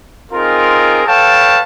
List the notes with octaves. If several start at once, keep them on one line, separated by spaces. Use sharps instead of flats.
C4 D#4 F4 G#4 A#4
A4 B4 C#5 F5 G5 A5